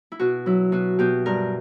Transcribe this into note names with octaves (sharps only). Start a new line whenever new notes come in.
E4
B2 F#4
F#3 E4
B2 F#4
B2 G4
G2 A#4